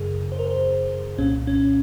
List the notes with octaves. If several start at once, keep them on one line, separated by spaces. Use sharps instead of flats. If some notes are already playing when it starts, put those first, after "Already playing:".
Already playing: F#2 C#3 G#4 A#4
C5
A#4
C5
C2 A#2 C#4
C#4